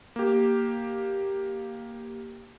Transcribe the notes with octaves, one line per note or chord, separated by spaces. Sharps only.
A#3 G4